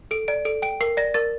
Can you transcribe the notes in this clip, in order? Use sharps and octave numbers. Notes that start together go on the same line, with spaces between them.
A4 D7
D5 D7
A4 D7
G5 D7
A#4 C7
D5 A#6
A#4 A6